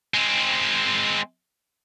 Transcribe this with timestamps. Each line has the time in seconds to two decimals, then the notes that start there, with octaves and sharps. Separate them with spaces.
0.14 G#3 C4